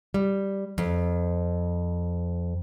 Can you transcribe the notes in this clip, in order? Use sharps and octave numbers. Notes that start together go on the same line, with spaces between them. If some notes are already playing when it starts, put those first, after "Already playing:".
G3
F2